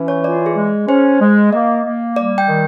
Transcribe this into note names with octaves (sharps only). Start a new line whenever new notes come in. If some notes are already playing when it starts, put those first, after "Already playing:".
Already playing: E3 C#4
C#5
F4 D5
G#4
G#3
G#4
C#4 C5
G#3
A#3 D#5
A#3
G3 D5
G5
D#3